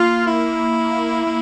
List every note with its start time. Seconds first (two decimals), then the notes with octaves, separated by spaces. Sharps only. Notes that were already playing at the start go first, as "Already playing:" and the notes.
Already playing: A#3 F4
0.26 E4
1.27 A#3